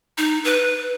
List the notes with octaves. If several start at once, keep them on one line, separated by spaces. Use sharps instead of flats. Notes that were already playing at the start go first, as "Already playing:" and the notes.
D#4
B4